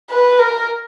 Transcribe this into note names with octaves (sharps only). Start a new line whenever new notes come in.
B4
A#4